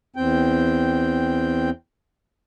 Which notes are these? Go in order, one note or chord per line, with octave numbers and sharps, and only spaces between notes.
E2 C4 G5